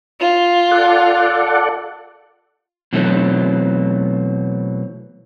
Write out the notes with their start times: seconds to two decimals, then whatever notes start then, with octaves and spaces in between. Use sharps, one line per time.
0.20 F4
0.71 A4 D5 F#5
2.93 B2 E3 F#3 A3 C4